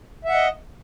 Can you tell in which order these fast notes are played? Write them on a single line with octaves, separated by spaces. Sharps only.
E5 F#5 D#5